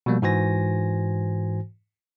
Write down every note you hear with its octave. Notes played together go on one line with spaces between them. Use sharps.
B2 F3 G3 A#3
G#2 E3 F#4 C5 G#5 A#6